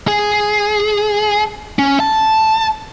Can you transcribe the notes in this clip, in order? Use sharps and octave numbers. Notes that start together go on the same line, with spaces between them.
G#4
C#4
A5